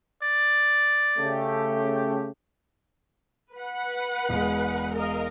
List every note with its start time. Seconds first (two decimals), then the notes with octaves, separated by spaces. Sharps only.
0.22 D5
1.18 C#3 A3 G4
3.54 B4 F#5
4.29 E1 G#3
4.94 A#4 D#5 F5